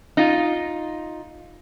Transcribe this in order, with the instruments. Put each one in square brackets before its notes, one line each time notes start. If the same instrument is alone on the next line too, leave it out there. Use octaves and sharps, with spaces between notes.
[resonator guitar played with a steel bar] D#4 F4